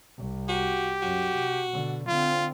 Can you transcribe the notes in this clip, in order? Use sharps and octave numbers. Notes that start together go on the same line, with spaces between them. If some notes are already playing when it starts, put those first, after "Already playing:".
C2
F#4 G4
F#2 F#4
C3
B2 D3
D3 C4 F4